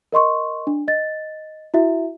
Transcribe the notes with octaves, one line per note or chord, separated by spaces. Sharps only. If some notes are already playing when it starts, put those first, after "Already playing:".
A#4 D#5 C6 C#6
D4
D#5 A6
E4 F#4 E5